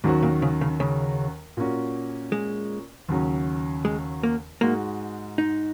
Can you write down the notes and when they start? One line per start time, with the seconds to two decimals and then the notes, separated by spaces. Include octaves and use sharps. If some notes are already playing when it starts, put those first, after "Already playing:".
0.04 D#2 G#2 D#3 F#3 C#4 F#4
0.22 A#2
0.42 C#3
0.61 C#3
0.80 C#3
1.57 A#2 A#3 C#4 F#4
2.32 G#3
3.09 D#2 C#3 F#3 C#4
3.85 G#3
4.23 A#3
4.61 G#2 G#3 A#3 F#4
5.38 D#4